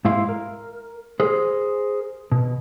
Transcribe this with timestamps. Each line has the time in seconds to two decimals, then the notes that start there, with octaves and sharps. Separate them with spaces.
0.05 G#2 E4 F5 C6
0.29 A#4
1.20 G#4 A#4 C5
2.32 B2